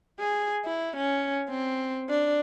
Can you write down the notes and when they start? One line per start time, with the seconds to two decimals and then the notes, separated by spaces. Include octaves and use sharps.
0.20 G#4
0.65 E4
0.97 C#4
1.49 C4
2.09 D4